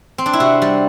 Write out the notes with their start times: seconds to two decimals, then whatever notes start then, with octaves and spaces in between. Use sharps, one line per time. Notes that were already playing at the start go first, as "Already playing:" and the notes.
0.18 C4
0.26 D4
0.33 E4
0.40 C3 F#4
0.62 G3